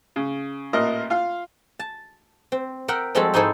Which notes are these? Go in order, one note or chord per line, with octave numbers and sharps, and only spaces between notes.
C#3
A1 A#2 A#4 D#5
F4 F5 F6
A5
C4
A#4 E5 F#5 G5
F3 G3 G#3 C4 F#4 A4
G#2 D#4 E4 G#4 A4 C5